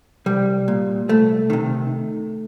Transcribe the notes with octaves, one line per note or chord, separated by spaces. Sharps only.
C2 G3
A#2
C2 A3
C3 D#3